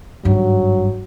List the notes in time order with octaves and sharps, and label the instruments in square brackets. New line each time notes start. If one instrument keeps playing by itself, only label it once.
[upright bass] G#1 G2 [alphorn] F#3